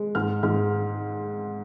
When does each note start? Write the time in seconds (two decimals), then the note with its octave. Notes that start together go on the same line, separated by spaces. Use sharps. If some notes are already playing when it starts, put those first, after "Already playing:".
Already playing: G#3
0.15 G#2 F6
0.43 G#2 F6